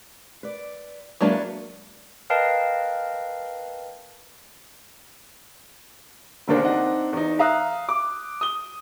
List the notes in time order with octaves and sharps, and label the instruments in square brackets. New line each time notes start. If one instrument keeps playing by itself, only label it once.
[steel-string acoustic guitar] B4 D5
[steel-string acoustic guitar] E2 G#3 A#3 [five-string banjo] F#3 D4 B4
[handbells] A#4 B4 D#5 F5 G5 A5
[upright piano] E1 D#2 D3 A#3 D4 C5
C4 D4 D#4 F#5
E2 D#4
E5 F5 A#5 D#6 F#6
D6
D#6 G7